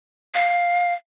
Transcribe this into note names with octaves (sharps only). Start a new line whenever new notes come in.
F5